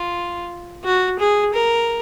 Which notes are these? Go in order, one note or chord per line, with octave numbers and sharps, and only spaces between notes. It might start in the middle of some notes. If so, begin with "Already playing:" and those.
Already playing: F4
F#4
G#4
A#4